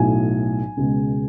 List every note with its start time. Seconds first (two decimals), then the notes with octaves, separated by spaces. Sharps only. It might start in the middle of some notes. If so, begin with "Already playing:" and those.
Already playing: B1 A2 F#3 G#5
0.77 C#2 B2 G#3